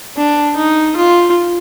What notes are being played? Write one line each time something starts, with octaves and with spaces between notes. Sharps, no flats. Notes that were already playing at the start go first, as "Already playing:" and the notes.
D4
D#4
F4